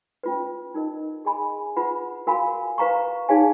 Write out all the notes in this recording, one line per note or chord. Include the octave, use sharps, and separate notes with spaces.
C#4 F4 B4
D#4 A#4 D#5
G#4 D#5 G#5 B5
F4 B4 F#5 B5
F#4 A#4 F5 G#5 B5
B4 F5 A#5 C#6
D#4 G#4 C#5 F5 G#5